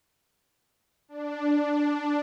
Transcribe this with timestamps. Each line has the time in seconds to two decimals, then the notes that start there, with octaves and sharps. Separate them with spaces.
1.09 D4